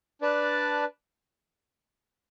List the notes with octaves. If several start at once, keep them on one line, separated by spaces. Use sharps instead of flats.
D4 B4 D5 A5